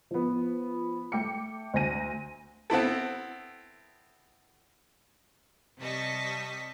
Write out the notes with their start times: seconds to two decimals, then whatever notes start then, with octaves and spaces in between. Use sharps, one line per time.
0.11 F3 B3
1.12 A3 G5 D6 C#7
1.74 D2 C5 G#5 A#6 D#7
2.70 B3 C4 E4 A4
5.80 C3 G3 D#5 A5 C#6 B6